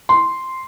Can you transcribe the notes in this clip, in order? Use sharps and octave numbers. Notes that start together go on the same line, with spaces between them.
C6